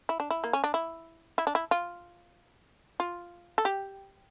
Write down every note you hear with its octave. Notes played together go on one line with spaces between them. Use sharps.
E4
D4
E4
A#3
C#4
D4
E4
E4
D4
E4
F4
F4
A4
G4